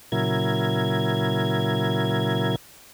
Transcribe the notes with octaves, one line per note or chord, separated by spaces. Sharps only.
A#2 C#3 F#3 E4 A#4 G#6